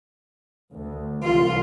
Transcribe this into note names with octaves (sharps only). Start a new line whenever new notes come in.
D2
C2 E3 F4